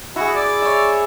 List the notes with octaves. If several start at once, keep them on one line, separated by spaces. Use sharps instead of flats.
E4 F#4 G#4
D5
C#5 E5